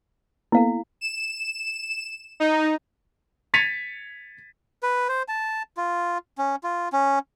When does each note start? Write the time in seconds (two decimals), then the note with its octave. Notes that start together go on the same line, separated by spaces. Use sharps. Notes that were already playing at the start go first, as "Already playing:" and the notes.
0.52 A#3 B3 E4 A4 F5
1.01 E7
2.40 D#4
3.54 G#6 A6 B6 C#7 D#7 F7
4.83 B4
5.09 C5
5.28 A5
5.77 F4
6.38 C#4
6.64 F4
6.93 C#4